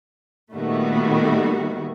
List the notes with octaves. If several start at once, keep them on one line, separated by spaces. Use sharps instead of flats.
A#2 D#3 G3 A3 B3 F#4